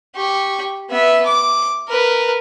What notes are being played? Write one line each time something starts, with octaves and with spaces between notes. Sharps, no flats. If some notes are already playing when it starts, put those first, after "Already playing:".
G4 C#6
B3 E5
D6
A#4 B4